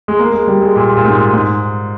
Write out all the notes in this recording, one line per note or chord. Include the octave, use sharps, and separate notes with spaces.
G#3
A#3
G#3
G3
G#3
A#2
A#2
G#2
G#2